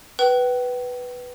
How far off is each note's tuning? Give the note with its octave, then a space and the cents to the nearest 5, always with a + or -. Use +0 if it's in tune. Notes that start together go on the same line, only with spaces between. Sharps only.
B4 +0 G5 -35